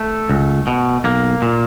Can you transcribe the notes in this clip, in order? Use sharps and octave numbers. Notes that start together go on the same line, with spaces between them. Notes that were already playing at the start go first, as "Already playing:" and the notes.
Already playing: A3
C#2
B2
B1 A#3
A#2